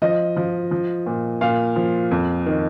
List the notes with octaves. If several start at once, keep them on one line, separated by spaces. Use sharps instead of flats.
F3 D#5
F3
F3
A#2
A#2 F5
F3
F2
D#3